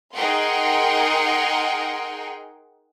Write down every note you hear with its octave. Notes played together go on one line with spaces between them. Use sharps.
D#4 G#4 A#4 F#5 G5 C6